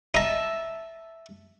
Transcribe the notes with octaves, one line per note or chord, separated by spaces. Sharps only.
D#4 E5 A5 A#5